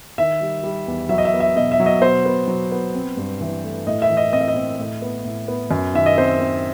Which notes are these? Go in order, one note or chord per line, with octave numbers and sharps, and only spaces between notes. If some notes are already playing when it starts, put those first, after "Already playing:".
D#3 E5
G3
G3
E2
F#3 E5
D#5
E5
B3
E5
B2 D#5
E5
F#3
D#5
B2 C5
B3
F#3
B3
C4
G2
E3
A3
A2 D#5
E5
E3
D#5
C4 D#5
E5
D#5
C4
A2
B3
A2
B3
F#2
D#3 E5
D#5
C4 C5
C4